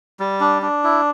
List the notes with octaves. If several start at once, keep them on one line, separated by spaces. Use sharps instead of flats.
G3
D4
D4
E4